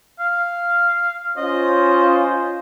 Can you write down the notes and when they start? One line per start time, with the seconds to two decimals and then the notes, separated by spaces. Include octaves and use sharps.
0.20 F5
1.37 C#4 F4 C5 D#5